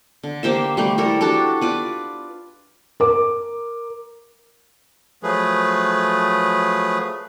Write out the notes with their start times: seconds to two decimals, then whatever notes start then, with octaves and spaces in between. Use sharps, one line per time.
0.23 D3
0.43 A#3 G4 C5 E5
0.77 G3 A3 G4
0.98 G3 E4 A4 A#4
1.21 D4 F#4 G4 A4
1.61 F4 B4 D5
3.00 A#4 D6
5.23 F3 F#3 A3 G#4 B4